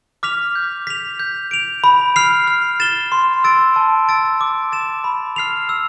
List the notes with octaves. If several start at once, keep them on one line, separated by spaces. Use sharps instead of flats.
D6 F6 B6 F7
G6
B6 F7
G6
D7 F7
B5
F6 C7 F7
F6
A6 E7 G7
C6
E6 A6 D7
A5
E6 A6 D7
D6
A6 E7
B5
F6 C7 F7
E6